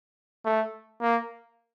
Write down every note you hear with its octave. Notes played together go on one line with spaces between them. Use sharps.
A3
A#3